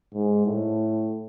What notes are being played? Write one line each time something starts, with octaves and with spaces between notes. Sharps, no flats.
G#2
A2